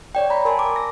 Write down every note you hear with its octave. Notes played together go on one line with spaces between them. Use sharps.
C#5 D5 G5
A#5 B5
A#4 G#5 A5 C6
D6
A#6